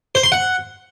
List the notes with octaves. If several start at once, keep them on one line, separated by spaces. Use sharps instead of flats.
C5
C6
F#5